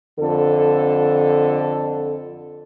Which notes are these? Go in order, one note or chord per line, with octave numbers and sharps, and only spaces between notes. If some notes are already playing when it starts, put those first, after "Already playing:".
F2 D3 A4